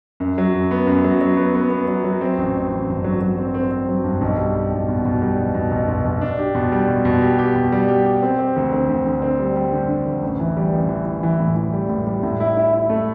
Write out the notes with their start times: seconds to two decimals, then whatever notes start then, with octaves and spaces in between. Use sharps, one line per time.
0.20 F#2
0.38 F#3
0.54 F#2
0.71 B3
0.87 F#2
1.04 F#3
1.21 F#3
1.37 B3
1.55 B3
1.70 B3
1.88 F#3
2.04 F#3
2.21 C4
2.38 A1
2.55 A1
2.71 A1
2.88 G2
3.04 F#3
3.21 F#3
3.38 C4
3.54 C4
3.71 C4
3.89 F#3
4.04 G2
4.21 B1
4.37 G3
4.54 G3
4.71 B1
4.88 B2
5.05 B2
5.22 G3
5.39 B1
5.54 B2
5.71 B1
5.88 B1
6.05 B1
6.21 D4
6.39 G4
6.55 B2
6.72 G3
6.88 B2
7.05 B2
7.22 G4
7.39 G4
7.55 B2
7.72 G3
7.88 G4
8.06 G4
8.22 C4
8.39 C4
8.56 D2
8.72 C4
8.89 D2
9.06 D3
9.22 C4
9.40 G3
9.56 G3
9.73 D3
9.89 D3
10.06 D2
10.22 A1
10.40 E3
10.57 G3
10.73 A1
10.89 E3
11.06 E3
11.23 E3
11.40 A2
11.56 E3
11.73 G3
11.89 A2
12.07 G3
12.23 A2
12.40 E4
12.57 E4
12.73 E4
12.89 A3